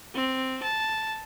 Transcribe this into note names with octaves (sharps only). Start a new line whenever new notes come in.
C4
A5